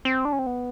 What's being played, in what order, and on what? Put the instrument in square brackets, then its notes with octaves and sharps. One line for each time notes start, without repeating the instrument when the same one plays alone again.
[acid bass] C4
D4
C#4
C4
B3